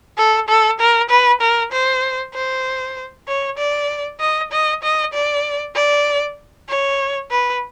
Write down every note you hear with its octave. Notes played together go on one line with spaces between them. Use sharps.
A4
A4
A#4
B4
A#4
C5
C5
C#5
D5
D#5
D#5
D#5
D5
D5
C#5
B4